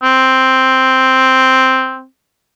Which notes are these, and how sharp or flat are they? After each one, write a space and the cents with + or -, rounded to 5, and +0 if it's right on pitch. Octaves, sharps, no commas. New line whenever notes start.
C4 +0